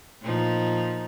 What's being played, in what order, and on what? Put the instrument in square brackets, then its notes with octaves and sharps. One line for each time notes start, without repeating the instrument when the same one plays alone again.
[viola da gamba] A#2 F3 D#4